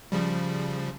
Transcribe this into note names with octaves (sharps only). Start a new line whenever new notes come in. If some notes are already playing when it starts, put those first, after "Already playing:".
C#3 F3 G3